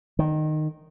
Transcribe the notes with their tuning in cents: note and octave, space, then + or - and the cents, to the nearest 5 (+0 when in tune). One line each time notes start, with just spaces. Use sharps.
D#3 -15